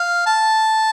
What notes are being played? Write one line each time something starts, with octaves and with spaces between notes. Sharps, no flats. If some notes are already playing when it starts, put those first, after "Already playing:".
Already playing: F5
A5